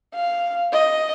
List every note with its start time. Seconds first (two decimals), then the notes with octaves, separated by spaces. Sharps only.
0.15 F5
0.72 D#5